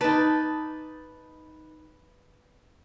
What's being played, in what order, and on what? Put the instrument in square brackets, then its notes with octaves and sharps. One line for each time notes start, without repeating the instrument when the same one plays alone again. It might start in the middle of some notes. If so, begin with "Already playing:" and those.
[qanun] D#4 D5 [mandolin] B4 A5